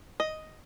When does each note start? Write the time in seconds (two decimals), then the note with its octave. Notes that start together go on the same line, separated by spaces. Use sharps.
0.20 D#5